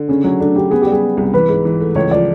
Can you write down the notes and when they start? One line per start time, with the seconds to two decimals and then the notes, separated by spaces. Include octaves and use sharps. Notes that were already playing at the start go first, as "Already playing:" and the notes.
Already playing: D3
0.09 C#3 C#4
0.24 F#3 C#4
0.40 A3 D4
0.55 C#3 G4
0.71 B3 G#4
0.82 G4
0.87 G3 G#4
1.02 B3
1.17 C2
1.34 E3 B4
1.49 G#2
1.65 E3
1.80 A3
1.95 C#2 C#5
2.11 F3 D5